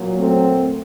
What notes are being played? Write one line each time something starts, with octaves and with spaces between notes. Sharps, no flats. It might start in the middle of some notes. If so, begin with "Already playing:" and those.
Already playing: A#2 F#3
A3 C4